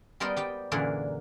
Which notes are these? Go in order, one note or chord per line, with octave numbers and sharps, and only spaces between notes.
G3 B3 A#4 C5 D#5 G5
G3 G4 G5
F#2 A#2 D3 E3 G#4 A#4